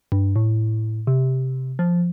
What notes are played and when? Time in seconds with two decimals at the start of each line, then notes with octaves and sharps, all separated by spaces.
0.12 G2
0.36 A2
1.07 C3
1.79 F3